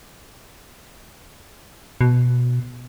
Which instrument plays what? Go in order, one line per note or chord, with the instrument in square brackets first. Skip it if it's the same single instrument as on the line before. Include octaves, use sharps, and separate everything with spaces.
[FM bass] B2